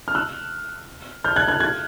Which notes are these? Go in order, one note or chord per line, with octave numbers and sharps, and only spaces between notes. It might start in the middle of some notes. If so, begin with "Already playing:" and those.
F6
E6 F#6
F6 G6
F#6 G#6
F#6 G#6
F#6 G#6